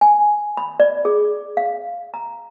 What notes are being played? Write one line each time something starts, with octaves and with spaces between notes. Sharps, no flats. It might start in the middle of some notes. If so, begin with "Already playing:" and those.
G#5
B5
D5
G#4
F5
A#5